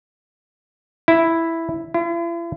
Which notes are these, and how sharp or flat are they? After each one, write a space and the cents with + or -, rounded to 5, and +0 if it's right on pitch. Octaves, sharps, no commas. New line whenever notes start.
E4 +0
E4 +45